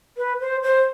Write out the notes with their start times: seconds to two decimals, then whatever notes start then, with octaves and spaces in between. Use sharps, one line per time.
0.17 B4
0.41 C5
0.63 C5